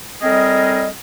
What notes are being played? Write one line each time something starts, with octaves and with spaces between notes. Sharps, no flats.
A2 G3 C4 G#4 A#4 D#5